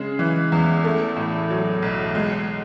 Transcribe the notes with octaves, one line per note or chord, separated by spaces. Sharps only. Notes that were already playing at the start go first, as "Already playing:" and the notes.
Already playing: C#3 G#3
E3
E2
A3
A2
F#3
B1
G#3